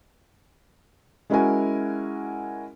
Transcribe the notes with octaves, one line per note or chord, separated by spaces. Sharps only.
G#3 C#4 E4 F#4 A#4 G#5